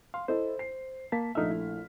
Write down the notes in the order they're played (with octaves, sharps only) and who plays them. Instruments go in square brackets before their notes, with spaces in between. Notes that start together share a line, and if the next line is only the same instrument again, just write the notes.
[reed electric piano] F5 [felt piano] C6
[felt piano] E4 A4 D#5 [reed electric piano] C5
[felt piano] C7
[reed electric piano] A#3 A5 [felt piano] B6
[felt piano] A#1 A3 F6 [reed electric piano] D#4 E5
[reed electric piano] E4